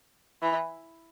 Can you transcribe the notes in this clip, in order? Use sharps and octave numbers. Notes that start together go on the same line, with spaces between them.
E3